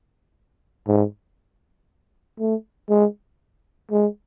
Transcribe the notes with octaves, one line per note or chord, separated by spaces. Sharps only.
G#2
A3
G#3
G#3